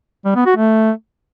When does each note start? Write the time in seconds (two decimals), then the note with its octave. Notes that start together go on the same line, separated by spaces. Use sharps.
0.25 G3
0.35 B3
0.46 F#4
0.56 A3